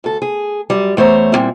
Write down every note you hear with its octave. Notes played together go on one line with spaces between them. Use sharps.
D2 A4
G#4
F#2 G3
E2 A3 C5 C#5 A#5
A#2 C#3 G3 C4 E4